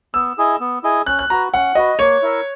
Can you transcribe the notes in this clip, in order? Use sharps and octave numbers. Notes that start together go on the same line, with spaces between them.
B3 E6
E4 G#4 D#5 G#5
B3
E4 G#4 D#5 G#5
C#4 F#6
F#6
F#4 B4 A#5
C#4 F#5
F#4 B4 D#5
A#3 C#5
E4 A#4 E5